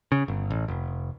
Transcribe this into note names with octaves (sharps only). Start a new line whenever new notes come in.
C#3
G1
A1
F1